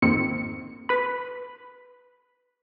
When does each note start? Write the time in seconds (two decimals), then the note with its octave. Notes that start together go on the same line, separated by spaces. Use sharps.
0.02 G#1 F2 D#3 A#3 C4 C#7
0.89 B4 B5